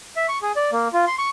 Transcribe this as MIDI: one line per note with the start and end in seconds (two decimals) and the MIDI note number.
0.16 0.27 76
0.29 0.38 85
0.42 0.52 68
0.56 0.70 74
0.72 0.88 58
0.93 1.05 65
1.07 1.15 84
1.18 1.30 85